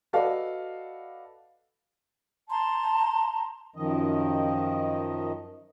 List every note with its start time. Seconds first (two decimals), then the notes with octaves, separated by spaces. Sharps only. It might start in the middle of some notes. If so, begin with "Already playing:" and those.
0.13 F#4 A4 B4 D5 D#5 F5
2.49 A5 A#5 C6
3.76 F#2 D#3 F3 D#5